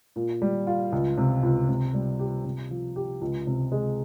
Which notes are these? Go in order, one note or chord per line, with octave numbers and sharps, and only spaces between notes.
A#2
G3
F4
C#2
C3
C#2
C3
G3
G4
C3
F3
G4
C#2
C3
G#3